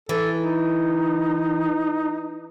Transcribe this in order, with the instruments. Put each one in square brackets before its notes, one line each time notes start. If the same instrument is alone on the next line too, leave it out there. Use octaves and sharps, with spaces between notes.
[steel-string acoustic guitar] E3 [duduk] A4
[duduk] D#4